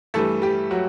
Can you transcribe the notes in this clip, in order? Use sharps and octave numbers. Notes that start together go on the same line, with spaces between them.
G2 E3 G3 A3 A4
G3 G4
F#3 F#4